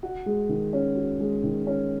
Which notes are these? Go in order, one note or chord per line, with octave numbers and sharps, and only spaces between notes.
F#4
G#3
D#3
C#4
F#4
G#3
D#3
C#4